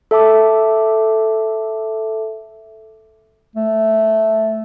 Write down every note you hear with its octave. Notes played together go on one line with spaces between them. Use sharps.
A4 E5 A5 D6
A3